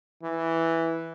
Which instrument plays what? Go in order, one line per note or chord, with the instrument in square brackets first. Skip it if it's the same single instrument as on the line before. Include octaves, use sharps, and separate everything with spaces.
[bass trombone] E3